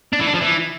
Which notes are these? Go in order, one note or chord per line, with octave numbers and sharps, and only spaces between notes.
D4
E3
D4
F3
E3